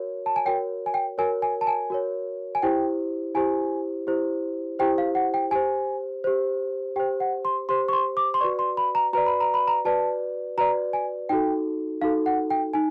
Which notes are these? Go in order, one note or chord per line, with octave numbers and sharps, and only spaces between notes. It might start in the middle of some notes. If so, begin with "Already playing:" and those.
Already playing: F#4 A#4 C#5
A5
G#5
F#4 A#4 C#5 G5
G#5
G5
F#4 A#4 C#5 G#5
G#5
A5
G#5
F#4 A#4 C#5
G#5
E4 G4 C5 G5
E4 G4 C5 G#5
E4 G4 C5
E4 G4 C5 G5
F5
F#5
G5
G4 C5 G#5
G4 C5
G4 C5 G5
F#5
C6
G4 C5 C6
C#6
C6
D6
C6
F#4 B4 D5 C#6
C6
B5
A#5
F#4 B4 D5 A#5
B5
A#5
B5
A#5
F#4 B4 D5 A5
F#4 B4 D5 A#5
G#5
D#4 F#4 A4 G5
D#4 F#4 A4 F5
F#5
G5
D#4 G#5